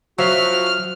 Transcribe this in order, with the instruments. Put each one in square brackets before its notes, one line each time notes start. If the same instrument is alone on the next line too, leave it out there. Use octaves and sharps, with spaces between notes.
[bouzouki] F3 [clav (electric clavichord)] F#3 E5 [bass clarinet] F#4 [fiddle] F6